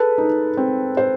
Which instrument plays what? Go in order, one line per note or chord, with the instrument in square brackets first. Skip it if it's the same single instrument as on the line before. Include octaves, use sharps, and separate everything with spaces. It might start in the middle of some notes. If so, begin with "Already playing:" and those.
Already playing: [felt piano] G#4 [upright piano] A4 B4
[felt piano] D#4
C4
C5